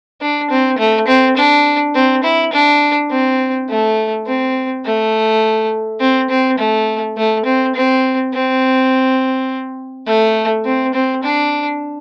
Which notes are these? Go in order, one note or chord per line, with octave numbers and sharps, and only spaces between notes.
D4
C4
A3
C4
D4
C4
E4
D4
C4
A3
C4
A3
C4
C4
A3
A3
C4
C4
C4
A3
C4
C4
D4